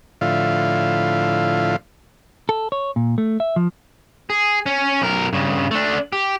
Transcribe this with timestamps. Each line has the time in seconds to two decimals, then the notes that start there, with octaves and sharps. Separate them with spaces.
0.21 A2 D3 F3 E4 F4
2.49 A4
2.72 C#5
2.96 A#2
3.18 A3
3.40 E5
3.56 F3
4.30 G#4
4.66 C#4
5.02 B1 A#4
5.33 G2 C#3
5.71 A3 D4
6.13 G4